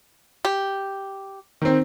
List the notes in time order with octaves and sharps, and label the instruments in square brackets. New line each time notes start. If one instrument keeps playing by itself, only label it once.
[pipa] G4
[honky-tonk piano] D#3 C4